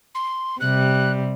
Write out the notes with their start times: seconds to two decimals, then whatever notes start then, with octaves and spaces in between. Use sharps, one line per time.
0.15 C6
0.60 C3 G3 F#6